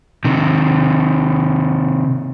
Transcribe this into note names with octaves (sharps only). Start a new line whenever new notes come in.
C3 D#3